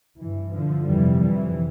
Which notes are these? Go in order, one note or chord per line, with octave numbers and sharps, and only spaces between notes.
G2 E3
D3 F3
F2 C3 E3 G3
E3